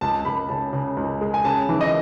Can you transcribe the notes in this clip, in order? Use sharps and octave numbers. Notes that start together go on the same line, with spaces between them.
C#2 A5
C#2 B5
C#3 A5
C#3
C#2
G#3
G#5
C#3 A5
E3
D#5